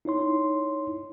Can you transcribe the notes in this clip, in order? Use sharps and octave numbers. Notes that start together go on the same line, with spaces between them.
D#4 E4 C#5 C6